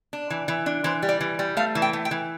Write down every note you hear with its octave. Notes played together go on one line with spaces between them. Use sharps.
D4
E3
E3
D4
E3 C5
G3
D5
E3
G3
A3 F5
E3
G5
A3
G5
E3